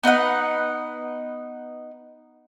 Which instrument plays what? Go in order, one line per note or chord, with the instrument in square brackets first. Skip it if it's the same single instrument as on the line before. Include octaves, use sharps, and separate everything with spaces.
[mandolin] B3 D#4 B4 F#5